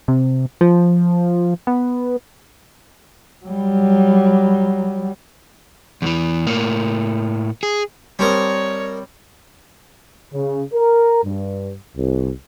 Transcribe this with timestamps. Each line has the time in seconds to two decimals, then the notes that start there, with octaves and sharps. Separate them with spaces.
0.08 C3
0.61 F3
1.67 B3
3.45 F#3 G3
6.02 E2 E3
6.47 A2 A#3
7.63 G#4
8.19 G3 C4 D4 A#4 C#5 D#5
10.33 C#3
10.73 A#4
11.23 G2
11.96 C2